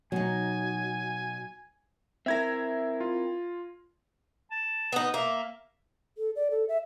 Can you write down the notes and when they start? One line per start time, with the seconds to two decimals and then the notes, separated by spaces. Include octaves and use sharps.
0.12 B2 F#3 D#4 G#5
2.26 C4 E4 A#4 E5 G#6 A#6
3.00 F4
4.51 A5
4.92 B3 D#4
5.14 A#3 E5
6.18 A4
6.36 D5
6.51 A4
6.69 E5